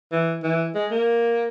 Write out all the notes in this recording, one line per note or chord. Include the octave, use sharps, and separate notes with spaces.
E3
E3
G#3
A#3